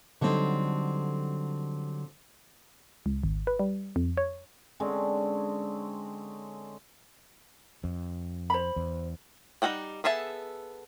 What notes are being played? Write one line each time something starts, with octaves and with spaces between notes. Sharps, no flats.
D3 F#3 G3 C4 D#4
C#2
G#1
B4
G3
F2
C#5
D3 G#3 C4 C#4
F2
C5 B5
E2
G3 D#4 A4 F#5 G5
B3 G#4 A4 E5 A5